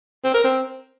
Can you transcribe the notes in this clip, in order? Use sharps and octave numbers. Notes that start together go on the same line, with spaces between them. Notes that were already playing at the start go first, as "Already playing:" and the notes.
C4
A#4
C4